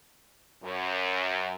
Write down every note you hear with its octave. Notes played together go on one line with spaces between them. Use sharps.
F#2